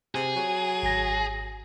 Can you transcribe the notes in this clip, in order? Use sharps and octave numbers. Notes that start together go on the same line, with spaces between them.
C3 G#4
F#3
G#1 A#6